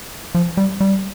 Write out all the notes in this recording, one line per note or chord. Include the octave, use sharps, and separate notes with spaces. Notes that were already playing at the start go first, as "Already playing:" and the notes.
F3
G3
G3